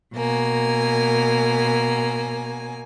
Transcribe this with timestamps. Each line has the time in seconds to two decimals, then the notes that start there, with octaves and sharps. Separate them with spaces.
0.15 B2 A#3 G#5